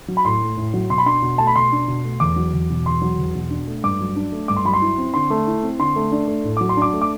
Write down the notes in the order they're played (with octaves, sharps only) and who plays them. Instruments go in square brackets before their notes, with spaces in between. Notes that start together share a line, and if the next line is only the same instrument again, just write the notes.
[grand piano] F#3
B5
A2 C6
A3
A2
F#3
B2 C6
B5
D4 C6
B2
A3 A5
B5
B2 C6
D4
B2
A3
E2 D6
F#3
E2
B2
E2 C6
F#3
E2
B2
D4
A3
G2 D6
F#3
D4
A3
G2 D6
C6
F#3 B5
C6
E4
C4
D3 C6
A3
E4
C4
D3 C6
A3
D4
A3
A2
F#3 D6
C6
D4 D6
A3
D6